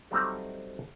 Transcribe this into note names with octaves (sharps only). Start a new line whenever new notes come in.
F#3 G3 A3 C4 D#4